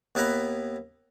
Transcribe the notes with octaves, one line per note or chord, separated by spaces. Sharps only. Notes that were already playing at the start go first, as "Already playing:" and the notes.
D#2 B3 E4 B4 A#5 B5